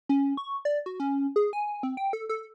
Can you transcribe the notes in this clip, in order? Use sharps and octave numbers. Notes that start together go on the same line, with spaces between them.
C#4
C#6
D5
F#4
C#4
G#4
G#5
C4
G5
A4
A4